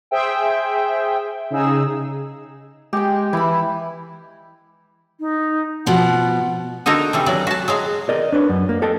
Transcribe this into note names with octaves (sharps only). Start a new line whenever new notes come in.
G#4 C5 E5 G5
C#3 D#4 G#4 E6
G#3 G4 G5
E3 E4 B5
D#4
B2 F3 F#5
D3 D#4 F#4 A4 A#4
C3 E3 G3
E3 F#3 D5
F#4 A5
F#3 G#3 F5
A#4 D5 D#5
D4 B4 C#5
F#2
A#3
A4 D#5 G5 A5